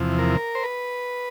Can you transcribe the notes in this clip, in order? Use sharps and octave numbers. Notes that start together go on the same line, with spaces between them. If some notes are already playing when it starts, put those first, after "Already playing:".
Already playing: E2 C3 F3
A#4
C5
B4